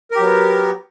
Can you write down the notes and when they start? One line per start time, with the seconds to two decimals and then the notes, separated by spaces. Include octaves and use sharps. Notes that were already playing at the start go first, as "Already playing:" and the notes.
0.11 A#4
0.16 G4
0.20 F#3
0.24 B3